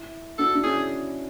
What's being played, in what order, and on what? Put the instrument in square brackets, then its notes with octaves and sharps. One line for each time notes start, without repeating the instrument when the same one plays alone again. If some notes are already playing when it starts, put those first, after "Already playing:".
Already playing: [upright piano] E4
[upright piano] D4 F#4 [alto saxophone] A4
[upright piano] D4
[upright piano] C#4 E4 [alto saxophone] G#4